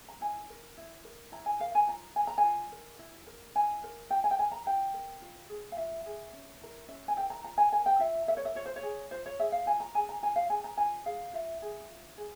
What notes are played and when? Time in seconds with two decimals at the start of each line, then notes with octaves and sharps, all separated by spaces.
0.09 A#5
0.21 E4 G#5
0.50 A#4
0.77 E4
1.04 A#4
1.32 E4 A#5
1.46 G#5
1.60 A#4 F5
1.75 G#5
1.88 F4 A#5
2.16 A#4 G#5
2.27 A#5
2.38 G#5
2.44 F4
2.72 A#4
2.99 E4
3.27 A#4
3.55 E4 G#5
3.83 A#4
4.10 F4 G5
4.24 G#5
4.31 G5
4.39 A#4 G#5
4.52 A#5
4.66 F4 G5
4.93 A#4
5.22 F4
5.49 G#4
5.72 F5
5.77 F4 E5
6.06 G#4
6.33 C#4
6.61 E4 A#4
6.88 C#4 E5
7.08 G#5
7.16 E4 A#4 G5
7.30 A#5
7.44 F4 A#5
7.58 G#5
7.72 A#4 G#5
7.86 G5
7.99 F4 E5
8.27 A#4 E5
8.37 C#5
8.45 E5
8.55 F4 C#5
8.66 C5
8.76 C#5
8.83 G#4
9.11 F4 C5
9.26 C#5
9.39 G#4 E5
9.52 F5
9.66 F4 G#5
9.80 A#5
9.95 G#4 G#5
10.09 A#5
10.22 F4 G#5
10.36 F5
10.50 G#4 G#5
10.64 A#5
10.78 F4 G#5
11.05 G#4 F5
11.33 F4 E5
11.62 G#4
11.90 F4
12.17 G#4